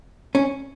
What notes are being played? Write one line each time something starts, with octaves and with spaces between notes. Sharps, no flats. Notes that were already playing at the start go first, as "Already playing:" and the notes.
C#4